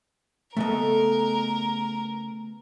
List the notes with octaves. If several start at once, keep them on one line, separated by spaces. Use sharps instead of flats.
C#3 A3 B3 A4 A#4 D#5